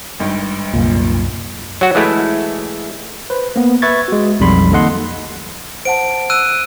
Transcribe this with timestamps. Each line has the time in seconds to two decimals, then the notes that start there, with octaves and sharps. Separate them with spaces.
0.20 G#1 G2
0.74 C2 F#2 A#2
1.81 F#3 F#4
1.95 E3 G#3 A3 E4
3.30 B4 C5
3.56 A#3 B3
3.82 B4 E5 C#6 G#6 A6
4.08 G#3 F#4
4.40 B1 F2 G3 B5 C6
4.72 D#3 A#3 A4 D#5 F#5 C6
5.85 C5 F#5 A5 D7
6.30 E6 F#6 D#7